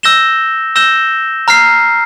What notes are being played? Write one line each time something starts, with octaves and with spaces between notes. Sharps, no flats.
E6 G6 A#6 E7 G7
E6 G6 A#6 E7 G7
A#5 F6 C7